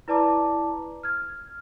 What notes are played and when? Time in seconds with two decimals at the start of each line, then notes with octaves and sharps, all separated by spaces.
0.08 E4 B4 D5 A5 A#5 D6
1.03 F6 G#6